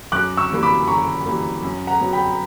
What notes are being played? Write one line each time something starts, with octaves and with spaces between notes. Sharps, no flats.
F#2 D6 F#6
C#6 E6
E3 G3 A#3
B5 D6
F#2 A#5 C#6
E3 G3 A#3
F#2
F#5 A#5
C#3 F#3 B3
G5 B5